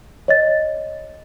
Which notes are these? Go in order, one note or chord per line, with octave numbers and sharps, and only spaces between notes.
C#5 D#5 A6